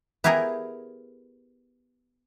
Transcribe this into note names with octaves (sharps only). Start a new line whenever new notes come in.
B3 E4 G4 G#4 A#4